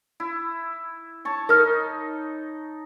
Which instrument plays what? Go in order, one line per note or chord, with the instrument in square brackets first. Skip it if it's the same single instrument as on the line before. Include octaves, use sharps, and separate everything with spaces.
[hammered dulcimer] E4
C#5 A5 C#6
[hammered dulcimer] D#4 [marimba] A#4 F6